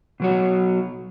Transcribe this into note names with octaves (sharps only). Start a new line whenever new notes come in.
B2 F#3 F#4